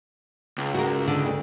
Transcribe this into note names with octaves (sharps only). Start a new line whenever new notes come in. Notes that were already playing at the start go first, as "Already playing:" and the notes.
C#2
F#4 A#4
D3
D2